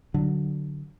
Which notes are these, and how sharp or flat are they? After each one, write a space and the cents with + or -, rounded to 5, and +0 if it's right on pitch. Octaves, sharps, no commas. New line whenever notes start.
D3 +0 F#3 +0